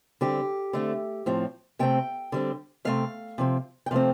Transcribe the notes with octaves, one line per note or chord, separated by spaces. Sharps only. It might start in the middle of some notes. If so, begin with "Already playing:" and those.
D3 G3 C4 G4
D3 A3 C4
A2 F3 C4
C3 A3 C4 G5
D3 G3 C4
C3 A3 C4 F5
C3 F3 C4
G5
C3 F3 A3 C4 F5